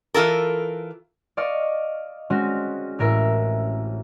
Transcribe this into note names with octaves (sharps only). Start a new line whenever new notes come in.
E3 F4 A4 A#4
D5 D#5 F5 C#6
G#3 C4 C#4 F#4
A1 A2 A#4 E5